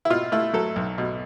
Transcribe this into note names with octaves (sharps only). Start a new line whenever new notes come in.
E4
B2 F4
A3 E4
F#3 A4
B1
B2